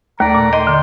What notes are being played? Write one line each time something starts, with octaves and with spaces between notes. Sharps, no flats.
D#2 A3 D5 A#5
A#2
D#5 G5 C6
D3